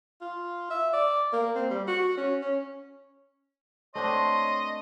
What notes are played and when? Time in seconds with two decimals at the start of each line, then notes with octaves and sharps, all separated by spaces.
0.21 F4
0.70 E5
0.93 D5
1.33 A#3
1.55 C4
1.70 G3
1.88 F#4
2.17 C#4
2.42 C#4
3.95 A3 C4 D4 C#5 D#5 C6